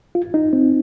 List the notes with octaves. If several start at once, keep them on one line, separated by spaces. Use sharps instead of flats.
F4
D#4
C4